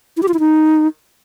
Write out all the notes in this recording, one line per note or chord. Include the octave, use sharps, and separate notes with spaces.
E4
G4
F4
E4
D#4